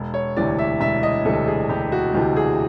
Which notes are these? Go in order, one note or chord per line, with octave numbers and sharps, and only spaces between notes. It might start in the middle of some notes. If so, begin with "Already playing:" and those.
Already playing: E1
C#5
D2 C3 E3 D5
E5
E1 E5
D#5
D2 C3 E3 A4
G#4
E1 G4
F#4
D2 C3 E3 G4
G#4